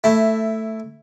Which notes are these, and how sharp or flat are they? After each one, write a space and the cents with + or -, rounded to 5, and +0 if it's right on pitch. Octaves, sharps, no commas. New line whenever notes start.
A3 +10 E4 +0